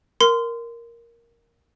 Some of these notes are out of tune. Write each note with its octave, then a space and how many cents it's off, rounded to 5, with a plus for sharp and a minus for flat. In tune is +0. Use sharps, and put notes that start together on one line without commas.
A#4 +0 C6 -25